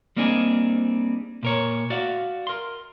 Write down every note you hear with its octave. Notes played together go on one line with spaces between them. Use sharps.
G3 A#3 C4 D4 D#4 G#4
A#2 A#4 C#5
F#4 D5 E5 F5
A#4 C6